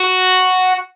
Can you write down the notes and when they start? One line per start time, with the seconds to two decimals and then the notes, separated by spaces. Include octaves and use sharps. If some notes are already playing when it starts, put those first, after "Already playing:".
Already playing: F#4